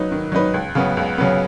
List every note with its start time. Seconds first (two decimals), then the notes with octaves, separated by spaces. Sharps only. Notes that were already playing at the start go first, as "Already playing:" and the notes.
Already playing: F#3 D#4 B4
0.12 D#3
0.32 F#3 D#4 B4
0.54 C#2
0.75 C#3 F#3 B3
0.97 C#2
1.18 C#3 F#3 B3